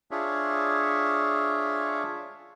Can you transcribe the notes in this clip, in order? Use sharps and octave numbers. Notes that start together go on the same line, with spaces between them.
D4 F4 G#4 C#5 E5